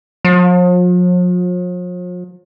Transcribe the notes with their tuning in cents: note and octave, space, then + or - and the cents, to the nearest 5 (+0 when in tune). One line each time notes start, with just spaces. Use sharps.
F3 +45